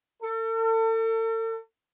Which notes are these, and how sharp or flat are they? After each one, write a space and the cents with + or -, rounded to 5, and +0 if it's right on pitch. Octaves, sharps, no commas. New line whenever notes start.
A4 +40